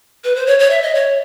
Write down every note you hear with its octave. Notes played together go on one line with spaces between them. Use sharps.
B4
C5
C#5
C#5
E5
D#5
C#5